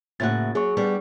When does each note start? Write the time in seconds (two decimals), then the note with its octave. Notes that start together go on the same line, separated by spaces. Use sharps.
0.20 A2 C#3 A#3 F#4 A6
0.55 F#3 G#4 C#6
0.77 G3 B3 D4